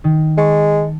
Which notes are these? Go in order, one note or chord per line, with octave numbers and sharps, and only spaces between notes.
D#3
G#3 A5 C#6